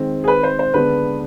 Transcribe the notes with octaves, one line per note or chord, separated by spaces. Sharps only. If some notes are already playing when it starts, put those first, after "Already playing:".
Already playing: D#3 G#3 C4
G#4
B4
C5
C5
D3 G#3 B3 D4 B4